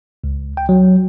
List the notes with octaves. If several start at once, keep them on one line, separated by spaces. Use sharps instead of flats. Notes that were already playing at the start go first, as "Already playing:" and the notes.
C#2
G5
F#3